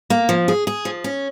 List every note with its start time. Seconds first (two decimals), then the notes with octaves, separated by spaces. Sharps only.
0.10 A#3
0.29 F3
0.48 G#4
0.67 G#4
0.85 F3
1.04 C#4